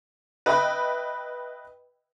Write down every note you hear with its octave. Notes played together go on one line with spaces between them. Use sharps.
B4 D#5 E5 G5 B5